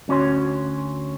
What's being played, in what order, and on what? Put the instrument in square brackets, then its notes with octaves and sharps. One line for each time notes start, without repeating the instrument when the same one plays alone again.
[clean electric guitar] D2 C#4 F#4 C#5 C6